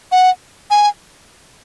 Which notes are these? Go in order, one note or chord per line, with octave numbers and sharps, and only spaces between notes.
F#5
G#5